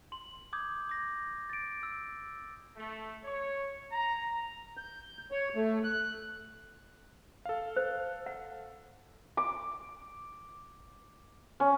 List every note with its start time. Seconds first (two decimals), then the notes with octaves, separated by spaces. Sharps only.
0.12 C6 F#7
0.53 D6 D#6 G6 G#6
0.89 D6 G6 A#6
1.50 A6 D7
1.83 E6
2.77 A3
3.24 C#5
3.92 A#5
4.77 G6
5.31 C#5
5.55 A3
5.84 F#6
7.45 A4 F5
7.76 C5
8.26 F#5
9.37 D6
11.60 C#4